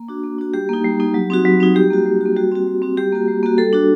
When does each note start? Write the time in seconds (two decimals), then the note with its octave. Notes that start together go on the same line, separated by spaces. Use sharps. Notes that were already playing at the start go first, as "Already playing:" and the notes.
Already playing: A#3
0.08 D4 F#4
0.23 A#3
0.39 D4 F#4
0.54 G3 G4
0.69 A#3 D#4
0.84 G3
1.00 A#3 D#4
1.14 F#3
1.30 C4 D#4 F#4
1.45 F#3
1.60 C4 D#4 F#4
1.75 G3 G4
1.90 A#3 F#4
2.06 G3
2.21 A#3 F#4
2.36 G3 F#4
2.52 C4 F#4
2.67 G3
2.82 C4 F#4
2.97 G3 G4
3.13 A#3 F#4
3.28 G3
3.43 A#3 F#4
3.58 G3 A4
3.73 D4 F#4